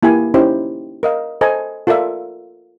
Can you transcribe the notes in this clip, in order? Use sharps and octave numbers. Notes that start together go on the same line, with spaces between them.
A#3 E4 G4 G#5
C#4 D#4 E4 G4 C5
A#4 D#5 F5
A4 C5 D#5 G#5 A#5
F4 A4 A#4 D5 E5 F5